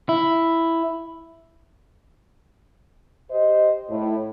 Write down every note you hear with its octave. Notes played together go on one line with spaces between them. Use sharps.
E4
G4 C5 D#5
A2